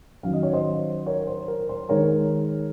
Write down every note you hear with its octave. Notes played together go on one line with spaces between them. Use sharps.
D#3 F#3 C#4 F5
D#5
C#5
C5 D#5
A#4 C#5
C5
A#4
C5
D#3 G#3 D#4 A#4 C#5